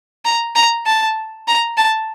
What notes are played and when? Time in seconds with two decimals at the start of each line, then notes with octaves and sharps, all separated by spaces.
0.25 A#5
0.56 A#5
0.86 A5
1.48 A#5
1.77 A5